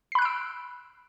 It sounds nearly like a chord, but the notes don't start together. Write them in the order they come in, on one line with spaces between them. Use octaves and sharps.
C7 B5 F#6 D7 E6